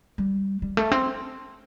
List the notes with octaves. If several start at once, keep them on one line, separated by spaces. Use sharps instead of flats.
G3
G3
A3
C4